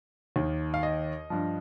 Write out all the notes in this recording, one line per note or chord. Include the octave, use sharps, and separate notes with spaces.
D#2 D#3
F5
D#5
G2 F3